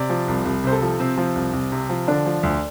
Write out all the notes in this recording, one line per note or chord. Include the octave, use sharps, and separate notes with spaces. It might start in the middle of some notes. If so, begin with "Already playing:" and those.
Already playing: C3 D5
F3
C2
C2
C3 C5
A4
F3
C3 C4
F3
C2
C2
C3
F3
D3 D4
F3
D2